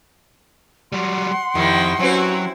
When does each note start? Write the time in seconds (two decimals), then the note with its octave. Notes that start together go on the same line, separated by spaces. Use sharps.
0.92 F#3 G3 F#5 C6
1.55 F2 D#3 G3 E4 G5
2.00 F#3 C4 C#4 E4 F#4 B4